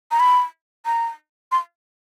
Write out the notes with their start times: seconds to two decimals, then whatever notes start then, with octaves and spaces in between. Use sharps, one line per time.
0.11 A#5
0.20 B5
0.86 A#5
1.52 C6